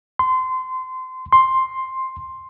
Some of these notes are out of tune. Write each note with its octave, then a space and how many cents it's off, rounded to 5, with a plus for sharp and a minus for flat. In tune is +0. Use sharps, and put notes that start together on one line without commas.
C6 -25
C6 +5